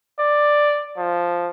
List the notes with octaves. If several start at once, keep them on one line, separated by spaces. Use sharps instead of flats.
D5
F3